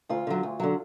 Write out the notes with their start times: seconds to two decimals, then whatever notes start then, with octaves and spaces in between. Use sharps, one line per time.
0.09 D2 F4
0.27 D3 F#3
0.43 D2
0.60 D3 F#3